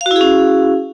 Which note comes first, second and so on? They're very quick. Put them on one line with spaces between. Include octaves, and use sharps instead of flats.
F5 F#4 E4 G#4 C#4